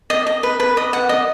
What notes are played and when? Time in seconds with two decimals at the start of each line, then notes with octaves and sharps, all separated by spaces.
0.10 D#5
0.27 D#5
0.43 B4
0.60 B4
0.77 D#5
0.93 F#5
1.09 D#5